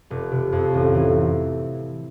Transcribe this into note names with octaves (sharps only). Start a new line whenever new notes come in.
F1
C3
F2
A1
E3